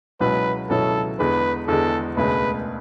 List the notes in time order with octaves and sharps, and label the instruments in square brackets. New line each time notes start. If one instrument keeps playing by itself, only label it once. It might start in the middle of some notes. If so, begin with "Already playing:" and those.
[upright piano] C#2 B2 F#3 C#4 E4 [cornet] B4
[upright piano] C#2 B2 F#3 C#4 E4 [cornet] A4
[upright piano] E2 D3 G#3 [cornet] B4
[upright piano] E2 D3 G#3 [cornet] A4
[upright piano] E1 D2 C#3 G#3 [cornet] B4